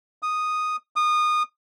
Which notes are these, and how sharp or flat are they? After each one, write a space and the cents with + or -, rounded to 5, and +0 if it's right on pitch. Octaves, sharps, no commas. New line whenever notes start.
D#6 -5
D#6 -25